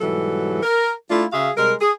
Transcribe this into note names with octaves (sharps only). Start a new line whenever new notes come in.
G#2 B2 E3 F#3 G3 A4
A#4
A3 D4 E4 F4
C#3 F#4 G#4 E5 F5
C3 G3 G#3 A#4
G#4